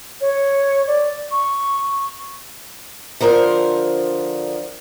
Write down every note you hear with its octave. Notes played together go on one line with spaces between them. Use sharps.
C#5
D5
C#6
D3 F3 A#4 C5